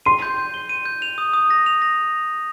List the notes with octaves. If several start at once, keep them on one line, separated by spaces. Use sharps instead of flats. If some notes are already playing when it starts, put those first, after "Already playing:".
C6 D#7
G6
G6
G7
D#7
G6
F7
D#6
D#6
A#6
F7
A#6